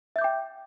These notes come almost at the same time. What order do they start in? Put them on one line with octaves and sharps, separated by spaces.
E5 G6 D6 G5